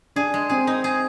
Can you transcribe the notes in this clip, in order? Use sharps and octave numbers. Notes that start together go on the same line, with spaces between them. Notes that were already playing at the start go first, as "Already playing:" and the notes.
D4 G#4
G#3
C4 G#4
D#4
G#4